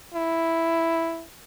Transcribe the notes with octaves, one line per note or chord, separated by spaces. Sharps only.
E4